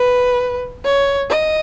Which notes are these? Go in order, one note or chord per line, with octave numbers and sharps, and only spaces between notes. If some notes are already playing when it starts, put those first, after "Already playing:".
Already playing: B4
C#5
D#5